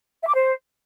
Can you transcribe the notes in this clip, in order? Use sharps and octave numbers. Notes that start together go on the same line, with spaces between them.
E5
D6
C5